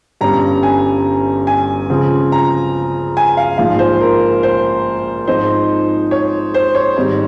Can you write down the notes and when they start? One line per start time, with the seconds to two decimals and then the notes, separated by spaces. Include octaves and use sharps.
0.21 G1 G2 G3 C#4 A#5
0.63 G#5
1.47 G#5
1.90 C#2 C#3 F3 C4
2.32 A#5
3.17 G#5
3.37 F5
3.58 A#1 G#2 F3 F5
3.79 C5
4.01 A#4
4.43 C5
5.27 G#2 F3 C4 D#4 C5
6.11 C#5
6.54 C5
6.75 C#5
6.96 G#1 G#2 G3 C4 D#4